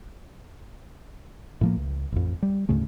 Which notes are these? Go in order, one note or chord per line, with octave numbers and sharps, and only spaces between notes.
A2 F3 A#3
C#2
A1 F2
G3
D2 G#2 C#3 A3